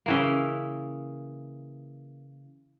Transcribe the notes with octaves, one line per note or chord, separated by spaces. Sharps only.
C#3 E3 A#3